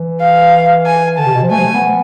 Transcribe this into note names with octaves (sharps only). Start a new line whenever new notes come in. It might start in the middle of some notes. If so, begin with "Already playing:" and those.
Already playing: E3
F5
G#5
D3 A5
C3
B2
F3
A3 G#5
F3
A3
B3